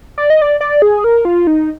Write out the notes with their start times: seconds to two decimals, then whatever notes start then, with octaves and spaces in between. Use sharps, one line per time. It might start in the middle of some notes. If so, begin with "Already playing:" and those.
0.18 D5
0.30 D#5
0.42 D5
0.61 D5
0.82 G#4
1.04 A#4
1.25 F4
1.47 D#4